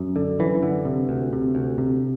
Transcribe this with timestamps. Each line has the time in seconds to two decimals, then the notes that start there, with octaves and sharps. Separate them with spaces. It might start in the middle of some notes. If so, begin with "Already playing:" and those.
Already playing: F#2
0.16 D3
0.39 F#2 E3
0.63 D3
0.85 C3
1.09 D2
1.33 C3
1.55 D2
1.78 C3